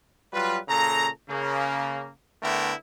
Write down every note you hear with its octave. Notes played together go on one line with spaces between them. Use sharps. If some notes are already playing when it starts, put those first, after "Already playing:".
F#3 G3 F4 B4
A#2 C#3 A4 A#5
C#3 A#3
D3 A3 B3 E4 A#4 G5